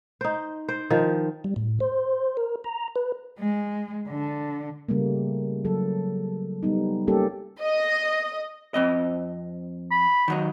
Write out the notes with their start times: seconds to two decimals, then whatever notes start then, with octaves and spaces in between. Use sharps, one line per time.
0.21 D#4 C5
0.69 C5
0.90 D#3 F3
1.44 G3
1.56 A2
1.80 C5
2.37 A#4
2.64 A#5
2.96 B4
3.39 G#3
4.07 D3
4.89 C#3 G3 A3 A#3
5.65 F#3 A4
6.63 G3 B3 D#4
7.07 G3 A#3 C#4 G4 A4
7.61 D#5
8.74 F2 C4 D#5
9.91 B5
10.28 D#3 F#3 D#4